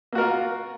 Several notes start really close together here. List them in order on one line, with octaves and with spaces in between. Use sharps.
A#3 F#4 A#4 F4